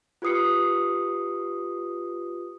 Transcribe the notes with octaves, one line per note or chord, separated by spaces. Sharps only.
F4 G4 B4 D#6 C7 C#7